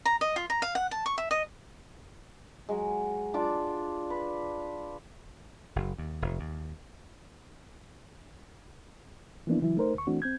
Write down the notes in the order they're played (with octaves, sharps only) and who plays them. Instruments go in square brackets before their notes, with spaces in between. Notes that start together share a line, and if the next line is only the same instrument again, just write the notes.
[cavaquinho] A#5
D#5
F4
A#5
F5
F#5
A5
C#6
E5
D#5
[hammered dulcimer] F#3 G#3
D4 F4 D6
B4
[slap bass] F#1
D#2
F1
D#2
[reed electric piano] E3 F3 A#3 B3 D4 E4
C#3 E3 F#3 E4
A3 D#4 A#4 C5
D2 C#6
E3 A3 C4 D4 F#4
C4 G6 G#6